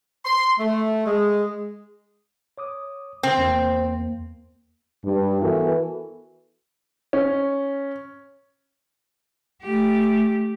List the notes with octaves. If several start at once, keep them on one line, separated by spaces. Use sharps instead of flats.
C6
A3
G#3
C#5 D6 D#6
C3 C4
E2 A#3
G2
E3 B3 F#4 A4 A#4
C#4
A3 G4